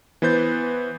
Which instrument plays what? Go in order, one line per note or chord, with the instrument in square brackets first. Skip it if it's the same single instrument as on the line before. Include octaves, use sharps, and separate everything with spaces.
[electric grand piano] E3 B3 B4 C5 G6 A6